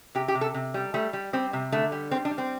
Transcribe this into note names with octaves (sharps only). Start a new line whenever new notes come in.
C3 G4
G4
C3
A4
C3
G3
G3 A3
G3
G3 C4
C3
D3 A3
G3
G3 C4
D4
G3
C4